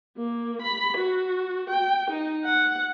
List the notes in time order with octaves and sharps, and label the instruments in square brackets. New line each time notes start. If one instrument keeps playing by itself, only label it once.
[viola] A#3
B5
F#4
G5
D#4
F#5